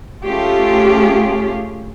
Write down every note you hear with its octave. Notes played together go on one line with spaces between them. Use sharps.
A3 C#4 F4 G4 G#4